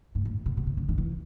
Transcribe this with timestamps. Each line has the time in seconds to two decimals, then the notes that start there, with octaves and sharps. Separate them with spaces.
0.15 G#2
0.25 A2
0.35 A#2
0.46 B2
0.57 B2
0.67 C3
0.77 C#3
0.89 D#3
0.98 E3